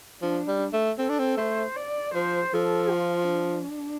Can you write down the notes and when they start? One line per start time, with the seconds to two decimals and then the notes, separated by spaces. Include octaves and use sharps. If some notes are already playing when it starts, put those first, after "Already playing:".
0.21 F3 D4
0.48 G3
0.73 A3
0.98 C4 A4
1.09 D4
1.19 C4
1.37 A3 C5
1.77 D5
2.14 F3 C5
2.54 F3 A4
2.92 F4
3.31 D4